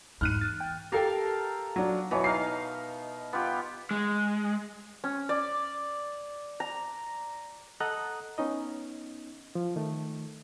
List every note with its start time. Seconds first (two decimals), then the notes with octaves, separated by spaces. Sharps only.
0.21 E2 G#2 D#4 F6 F#6 D#7
0.41 A6
0.60 G5
0.92 G4 A4 A#4 F5 G5 A5
1.76 F#3 D4
2.11 B2 E3 F#3 C#5
2.24 D#4 F5 A#5 C7
3.33 B3 F4 G4
3.91 G#3
5.04 C#4
5.29 D5
6.60 A#5
7.80 A4 D#5 F#5 A#5 D#6 F#6
8.38 B3 C#4 D#4 D#5
9.55 F3
9.76 D#3 A3